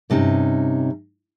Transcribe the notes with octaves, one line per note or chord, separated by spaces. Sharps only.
G2 C3 C#4 D#4